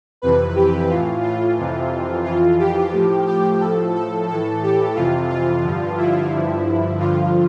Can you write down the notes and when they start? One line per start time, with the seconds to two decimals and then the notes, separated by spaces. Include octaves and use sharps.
0.22 F2 C3 E3 B4
0.56 G4
0.90 A2 E3 F4
1.24 F4
1.57 F2 C3 E3
2.25 F2 E3 F4
2.59 G4
2.93 A2 F3
3.27 G4
3.60 A2 F3 A4
3.95 A4
4.28 A2 E3 A4
4.63 G4
4.95 F2 C3 E3 F4
5.29 F4
5.64 G2 D3 F3
5.97 E4
6.32 G2 D3 F3
6.99 G2 D3 F3 F4